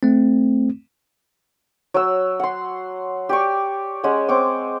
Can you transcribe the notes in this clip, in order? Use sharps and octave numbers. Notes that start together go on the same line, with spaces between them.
A3 C4
F#3 E6
F#5 C6
G4 D5 C#6
G#3 C#4 F#5 G#5
C4 C#6 D6